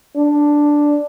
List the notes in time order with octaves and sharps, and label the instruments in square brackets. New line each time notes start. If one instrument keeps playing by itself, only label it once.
[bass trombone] D4